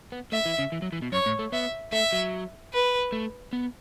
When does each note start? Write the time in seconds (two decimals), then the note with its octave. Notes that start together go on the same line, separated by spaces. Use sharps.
0.12 B3
0.32 A3 E5
0.45 E3
0.59 C#3
0.72 E3
0.82 F#3
0.92 E3
1.02 B2
1.12 F#2 C#5
1.26 A2
1.39 A3
1.52 B3 E5
1.92 A3 E5
2.13 F#3
2.73 B4
3.12 A3
3.53 B3